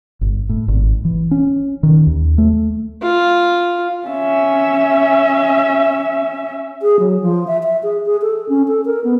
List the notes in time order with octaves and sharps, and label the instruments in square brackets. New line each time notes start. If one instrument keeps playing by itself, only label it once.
[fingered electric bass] G1
A2
G#1
E3
C#4
D#3
D#2
A3
[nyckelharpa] F4
[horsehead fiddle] C#4 E5
[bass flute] G#4
F#3
F3
E5
E5
G#4
G#4
A4
C#4
A4
A#4
B3